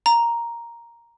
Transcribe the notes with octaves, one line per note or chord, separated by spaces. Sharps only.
A#5